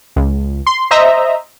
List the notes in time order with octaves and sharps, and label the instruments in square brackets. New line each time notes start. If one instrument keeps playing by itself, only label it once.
[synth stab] C#2
C6
C5 D#5 E5 A#5